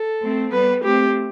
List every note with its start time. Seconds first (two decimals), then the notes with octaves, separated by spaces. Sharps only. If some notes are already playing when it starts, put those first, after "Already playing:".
Already playing: A4
0.21 A3 C4
0.52 G3 B3 B4
0.83 A3 C4 G4